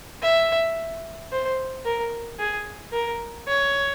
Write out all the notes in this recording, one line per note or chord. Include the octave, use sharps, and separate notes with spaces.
E5
C5
A#4
G#4
A#4
C#5